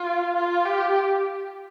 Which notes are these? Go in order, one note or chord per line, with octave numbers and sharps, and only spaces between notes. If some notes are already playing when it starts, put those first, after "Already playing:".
Already playing: F4
F4
G4